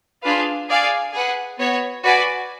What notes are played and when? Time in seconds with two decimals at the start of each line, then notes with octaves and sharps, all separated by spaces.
0.23 D4 F4 G#4 B4 F5
0.68 G#4 D5 F5 G#5
1.13 G#4 B4 F#5
1.58 B3 F#4 C#5
2.03 F#4 B4 D5 G#5